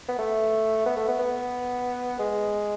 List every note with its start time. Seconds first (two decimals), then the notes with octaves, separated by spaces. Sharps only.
0.08 B3
0.19 A3
0.86 B3
0.97 A3
1.08 B3
1.19 B3
2.19 G#3